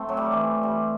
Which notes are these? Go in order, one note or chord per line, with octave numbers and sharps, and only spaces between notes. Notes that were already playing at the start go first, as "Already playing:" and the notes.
Already playing: A3 C4
F#3
G3
E3
G3